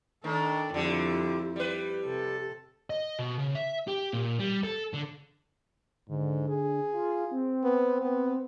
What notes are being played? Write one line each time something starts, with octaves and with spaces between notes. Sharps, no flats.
D#3 D4 A4
F2 D3 G3 E4
G3 B4
C3 A4
D#5
B2
C#3
E5
G4
A#2
G3
A4
D3
G#2 D3
G#4
F4
C4
B3
B3